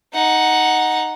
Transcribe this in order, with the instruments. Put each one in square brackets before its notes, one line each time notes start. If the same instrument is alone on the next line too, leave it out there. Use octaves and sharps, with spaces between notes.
[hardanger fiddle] D#4 F#5